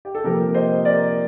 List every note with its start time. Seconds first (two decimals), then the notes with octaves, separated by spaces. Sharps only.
0.05 G4
0.15 A4
0.24 C3 F3 A#3 G4 A#4
0.54 C5 D#5
0.85 A#4 D5